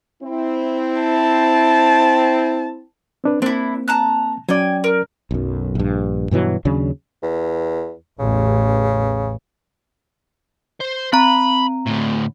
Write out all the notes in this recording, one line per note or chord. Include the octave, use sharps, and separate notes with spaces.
C4 E4
A5
C4 D4 B4
A#3 C4 D4 E4
A5 A#5 F#6
F#3 C#4 D5 G5 G#5
A#4
B1 F#2
A#1 G2
G2 B2 E3 F#3
D#2 C#3 F#3 D4
E2
A1 E2 C#3
C5
C4 A#5 B5
D2 A2